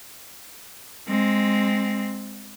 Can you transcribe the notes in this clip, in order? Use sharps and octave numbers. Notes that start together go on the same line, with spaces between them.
G#3 C4